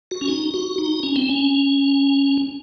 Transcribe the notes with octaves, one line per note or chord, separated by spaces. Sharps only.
F#4
C#4
D#4
F#4
D#4
C#4
C4
C#4